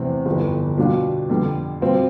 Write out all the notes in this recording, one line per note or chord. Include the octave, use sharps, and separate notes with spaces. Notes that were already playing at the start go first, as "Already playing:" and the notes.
Already playing: E2 C3 E3 A3 C4
G1 F2 E3
B2 G3 D4 F4
F2 D3 G3
B2 G3 C4 F4